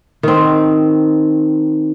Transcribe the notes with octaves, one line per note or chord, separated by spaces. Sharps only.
D#3 C4